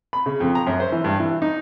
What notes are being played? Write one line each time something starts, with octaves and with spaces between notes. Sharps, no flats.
B5
C#3
F2
A#5
F#2
C5
E3
G2
E3
D#4